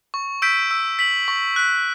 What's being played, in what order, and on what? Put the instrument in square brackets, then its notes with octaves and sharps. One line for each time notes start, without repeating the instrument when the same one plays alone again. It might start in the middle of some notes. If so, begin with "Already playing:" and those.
[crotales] C#6
E6 G6 B6 D7
E6
B6 F#7
C#6
F#6 B6